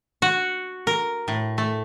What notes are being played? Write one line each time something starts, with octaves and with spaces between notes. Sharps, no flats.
F#4
A#4
A2
A3